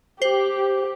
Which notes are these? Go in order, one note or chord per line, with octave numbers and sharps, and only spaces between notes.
G4 C5